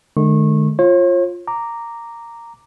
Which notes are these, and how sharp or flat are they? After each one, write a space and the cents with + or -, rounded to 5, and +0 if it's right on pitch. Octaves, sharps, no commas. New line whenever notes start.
D3 +45 G#3 +40 C#6 -30
F4 +0 C#5 -45
A#5 -5 D6 +0